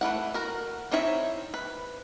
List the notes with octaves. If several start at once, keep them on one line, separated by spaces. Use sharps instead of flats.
E3 A3 E4 F#5
F#4 A#4
C4 D#4 E4 C#5 E5
B4